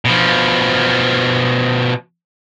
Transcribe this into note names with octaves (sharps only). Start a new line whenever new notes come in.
B2 F3